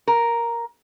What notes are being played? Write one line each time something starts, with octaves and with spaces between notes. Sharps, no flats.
A#4